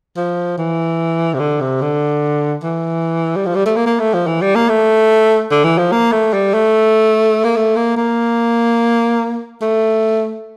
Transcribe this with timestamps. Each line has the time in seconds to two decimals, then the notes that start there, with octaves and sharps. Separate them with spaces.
0.17 F3
0.58 E3
1.34 C3
1.39 D3
1.60 C3
1.81 D3
2.63 E3
3.36 G3
3.46 F3
3.55 G3
3.66 A3
3.76 A#3
3.86 A#3
4.00 A3
4.14 F3
4.27 E3
4.42 G3
4.55 A#3
4.69 A3
5.51 D3
5.64 E3
5.78 F3
5.92 A#3
6.12 A3
6.33 G3
6.54 A3
7.44 A#3
7.56 A3
7.76 A#3
7.97 A#3
9.61 A3